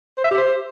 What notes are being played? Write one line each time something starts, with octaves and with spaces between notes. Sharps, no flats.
C5
E5
G4
C5